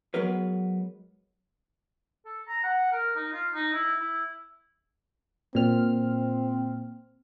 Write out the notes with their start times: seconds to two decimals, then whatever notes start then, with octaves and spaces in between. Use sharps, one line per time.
0.14 F#3 G#3 B3 A#4 B4
2.25 A4
2.47 A#5
2.63 F#5
2.92 A#4
3.16 D#4
3.32 F4
3.54 D#4
3.73 E4
4.00 E4
5.55 A#2 C4 F6